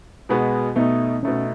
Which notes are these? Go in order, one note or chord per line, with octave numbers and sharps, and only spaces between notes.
B2 G#3 B3 F#4
B2 A3 B3 D#4
B2 A3 C#4 D#4